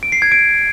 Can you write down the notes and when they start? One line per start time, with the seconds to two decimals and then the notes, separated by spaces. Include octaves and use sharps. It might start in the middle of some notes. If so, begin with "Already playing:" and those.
0.03 D7
0.12 C7
0.22 G#6
0.32 D7